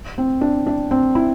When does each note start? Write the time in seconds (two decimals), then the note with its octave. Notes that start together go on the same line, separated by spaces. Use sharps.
0.18 C4
0.41 D4
0.66 D4
0.91 C4
1.15 E4